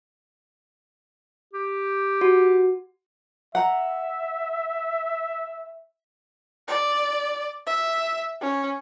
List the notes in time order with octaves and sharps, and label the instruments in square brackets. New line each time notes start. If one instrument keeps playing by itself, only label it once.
[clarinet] G4
[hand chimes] F#4
[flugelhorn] E5 [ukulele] F#5 A#5
[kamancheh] D5
E5
C#4